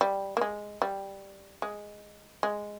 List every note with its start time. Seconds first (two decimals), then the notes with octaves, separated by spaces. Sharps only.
0.01 G3
0.37 A#3
0.41 G#3
0.82 G3
1.62 G#3
2.43 G#3